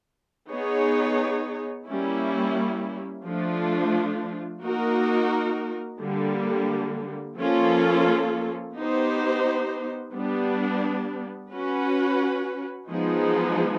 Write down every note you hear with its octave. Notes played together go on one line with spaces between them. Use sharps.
B3 D#4 G#4 C#5
G3 A#3 C#4 E4
F3 A3 D4 F4
A#3 D#4 F#4 A#4
D3 G3 A#3
F3 A#3 C#4 F4 A4
B3 D#4 G4 C5
G3 B3 D4
C#4 F#4 B4
F3 G#3 B3 D#4 G#4